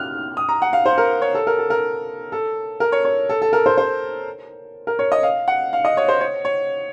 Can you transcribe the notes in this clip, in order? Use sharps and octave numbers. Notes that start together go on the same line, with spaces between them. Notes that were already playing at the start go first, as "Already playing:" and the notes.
Already playing: F6 F#6
D#6
A#5
F#5
F5
C5
A#4
C#5
A4
A#4
A4
A#4
A4
A#4
C#5
C#5
A4
A4
A#4
C5
C5
A#4
C#5
D#5
F5
F#5
F5
D#5
C#5
C5
C#5
C#5